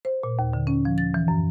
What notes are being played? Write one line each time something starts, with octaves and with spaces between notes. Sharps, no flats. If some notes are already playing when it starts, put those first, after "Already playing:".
C5
A#2
D#2
D3
C#4
F3
A6
E3
F#2